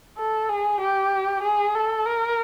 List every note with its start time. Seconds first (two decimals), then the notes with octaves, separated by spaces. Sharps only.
0.18 A4
0.49 G#4
0.81 G4
1.43 G#4
1.75 A4
2.06 A#4